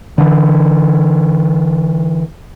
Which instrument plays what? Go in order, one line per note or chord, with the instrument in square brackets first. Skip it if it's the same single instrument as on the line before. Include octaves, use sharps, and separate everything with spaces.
[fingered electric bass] D3 E3